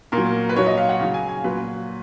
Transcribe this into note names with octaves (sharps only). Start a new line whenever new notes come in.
A#2 A#4
F#3
B4
A#2 F#3 C#5
D#5
F5
F#5
C#3 F#3 F5
G#5
G#5
A#2 F#3 B4